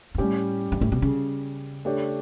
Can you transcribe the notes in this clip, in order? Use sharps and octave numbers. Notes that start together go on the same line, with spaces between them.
G2
A2 G3 C#4 G4
G2
A2
B2
C#3
A3 D4 G4 C#5